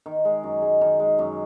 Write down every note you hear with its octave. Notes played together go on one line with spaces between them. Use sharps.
D#3
G#3
F#2
G#3
D#3
G#3
F#2